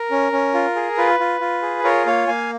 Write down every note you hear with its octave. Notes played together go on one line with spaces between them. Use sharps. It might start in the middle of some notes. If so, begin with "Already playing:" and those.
Already playing: A#4
C#4
C#4
F4
G#4
F4 B4
F4
F4
G#4
F4 A#4 C#5
A#3 C#5 F5
A#3 F5 G#5